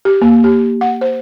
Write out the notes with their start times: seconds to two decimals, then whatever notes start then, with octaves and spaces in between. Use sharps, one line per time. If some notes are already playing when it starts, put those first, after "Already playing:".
0.05 G4
0.21 A#3
0.44 G4
0.81 F#5
1.01 C5